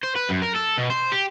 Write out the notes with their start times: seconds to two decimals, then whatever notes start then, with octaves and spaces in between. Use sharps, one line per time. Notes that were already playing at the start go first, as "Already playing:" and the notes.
0.04 C5
0.16 B4
0.30 F#2
0.43 A#4
0.56 A4
0.78 B2
0.90 C5
1.12 G4